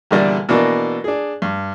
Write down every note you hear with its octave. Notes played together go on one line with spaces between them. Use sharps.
E2 A#2 D3 G3 D4
B2 E3 A#3 D4
D4 G#4
G2